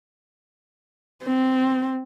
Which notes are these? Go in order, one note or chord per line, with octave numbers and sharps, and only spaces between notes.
C4